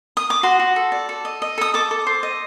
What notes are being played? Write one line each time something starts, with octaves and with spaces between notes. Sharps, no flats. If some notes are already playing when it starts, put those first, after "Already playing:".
D#6
D6
F#4 C6
F#4
A4
D5
A4
D#5
D#5
A4 D#6
A4 D6
A4
C5
D#5